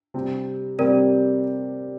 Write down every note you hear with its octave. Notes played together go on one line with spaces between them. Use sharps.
C3 G3 C4
C3 G3 C4 A#4 D5